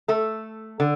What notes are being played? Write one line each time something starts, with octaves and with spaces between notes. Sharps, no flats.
A3 A4
D3